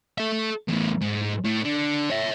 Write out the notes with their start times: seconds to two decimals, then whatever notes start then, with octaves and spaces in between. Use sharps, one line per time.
0.18 A4 E5
0.68 E2 A2
1.01 G#2
1.44 A2
1.64 D3
2.10 C#5 E5